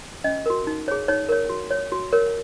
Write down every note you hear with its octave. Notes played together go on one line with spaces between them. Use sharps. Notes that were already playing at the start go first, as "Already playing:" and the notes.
C#4 D#5
F#4 A#4
D#4
G#4 C#5
D#4 C#5
A#4 C#5
F#4
C#5
F#4
A#4 C#5